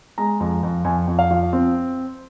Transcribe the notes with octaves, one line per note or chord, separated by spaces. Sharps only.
G#3 A#5
F2
F2
F2 G#5
F2
F5
F3
C4